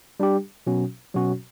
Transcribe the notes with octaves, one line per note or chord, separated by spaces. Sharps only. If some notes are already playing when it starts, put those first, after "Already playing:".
G3 D4 G4
B2 F#3 C#4 F#4
B2 F#3 C#4 F#4